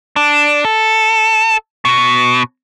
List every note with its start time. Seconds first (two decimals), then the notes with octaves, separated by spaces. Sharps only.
0.16 D4
0.65 A4
1.85 B2